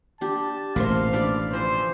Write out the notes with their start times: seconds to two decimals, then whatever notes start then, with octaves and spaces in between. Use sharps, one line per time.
0.21 D4 G4 A5
0.76 A1 B2 A#3 C5 F5
1.13 E3 D4 D5
1.53 D3 E3 F3 C5